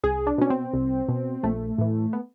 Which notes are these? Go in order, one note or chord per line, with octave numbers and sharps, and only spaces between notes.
C2 G#4
D4
B2 C#4
C4
C2
B2
A#1 A3
A2 E3
B3